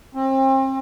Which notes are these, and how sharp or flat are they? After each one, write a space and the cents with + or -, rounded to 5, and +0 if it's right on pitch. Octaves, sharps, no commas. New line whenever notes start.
C4 +35